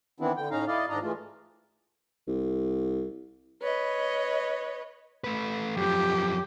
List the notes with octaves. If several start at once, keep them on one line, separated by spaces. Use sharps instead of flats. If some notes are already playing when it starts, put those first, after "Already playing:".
D#3 E3 B3 C4 D4 E4
D3 G5
A2 C#4 D#4 F5 A#5
E4 D5 D#5 F5
G#2 D#3 D4 D5 D#5 A#5
E3 G#3 A3 F4
C2
B4 C#5 D#5
A3 B4
F#2 F3 G4